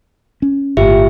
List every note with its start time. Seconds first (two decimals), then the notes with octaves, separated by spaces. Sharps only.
0.42 C#4
0.77 G1 A2 F4 G4 E5